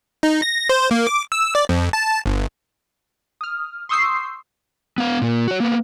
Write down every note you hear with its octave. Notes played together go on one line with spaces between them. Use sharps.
D#4
A#6
C5
A#3
D6
E6
D5
F2
A5
G1
D#6 F6
C6 C#6 D#6 E6 G6 C7
B3 F5
A#2 A#3
F#4 C#5
A#3 B3